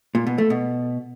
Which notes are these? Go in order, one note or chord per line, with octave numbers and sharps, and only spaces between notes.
A#2
B2
A3
B2